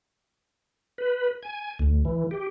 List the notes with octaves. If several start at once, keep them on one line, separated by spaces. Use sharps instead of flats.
B4
G#5
D2
E3
G4